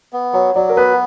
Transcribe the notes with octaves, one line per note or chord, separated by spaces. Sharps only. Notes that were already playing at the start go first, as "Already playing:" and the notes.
B3
F#3 C#5
F#3 D5
A#4
B3 B4